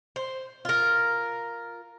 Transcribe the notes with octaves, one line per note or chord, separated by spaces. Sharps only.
C5
F4 A#4